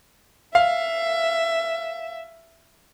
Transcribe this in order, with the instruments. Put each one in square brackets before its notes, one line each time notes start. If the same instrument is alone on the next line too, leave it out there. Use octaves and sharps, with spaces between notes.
[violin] E5 [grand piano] F5